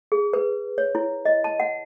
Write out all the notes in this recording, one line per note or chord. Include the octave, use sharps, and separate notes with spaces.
G#4
B4
C#5
E4
D#5
A5
F#5